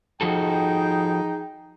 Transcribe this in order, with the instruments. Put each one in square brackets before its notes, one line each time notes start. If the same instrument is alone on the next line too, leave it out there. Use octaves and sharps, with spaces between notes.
[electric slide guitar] F3 F#4 A4 [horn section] D#4 G#4 G5